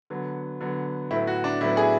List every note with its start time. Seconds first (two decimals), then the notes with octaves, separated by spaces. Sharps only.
0.10 D3 F#3 B3
0.61 D3 F#3 B3
1.11 A2 F#3 B3 E4
1.27 F#4
1.44 D4
1.61 A2 F#3 B3 E4
1.77 G#4